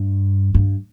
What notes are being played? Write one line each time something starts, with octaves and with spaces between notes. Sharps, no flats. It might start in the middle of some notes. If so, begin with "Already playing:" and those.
Already playing: G2
G2